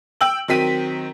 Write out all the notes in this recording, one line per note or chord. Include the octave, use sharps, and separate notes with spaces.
G5 E6 F#7
D#3 F#3 C4 B6 D#7